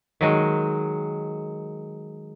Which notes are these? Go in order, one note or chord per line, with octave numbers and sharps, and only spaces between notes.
D#3 F#3 G#3